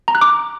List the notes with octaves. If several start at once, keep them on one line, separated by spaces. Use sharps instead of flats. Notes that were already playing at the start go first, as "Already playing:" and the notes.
A#5
F#6
D6